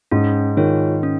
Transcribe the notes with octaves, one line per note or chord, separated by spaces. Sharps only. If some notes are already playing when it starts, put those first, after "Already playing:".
G#2 C#4
D#3 F4 G#4 C#5
C#4